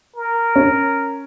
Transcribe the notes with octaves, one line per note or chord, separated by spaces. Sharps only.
A#4
C#4